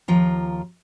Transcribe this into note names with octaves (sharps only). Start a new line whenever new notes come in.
D#2 F3 F4 A#5